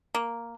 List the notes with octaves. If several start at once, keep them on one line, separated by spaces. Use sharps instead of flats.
A#3